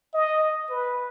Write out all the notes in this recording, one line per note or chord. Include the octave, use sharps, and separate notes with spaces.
D#5
B4